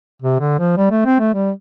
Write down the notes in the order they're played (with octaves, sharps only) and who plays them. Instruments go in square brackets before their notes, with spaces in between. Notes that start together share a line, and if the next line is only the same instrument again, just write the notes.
[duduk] C3
D3
F3
G3
A3
C4
A3
G3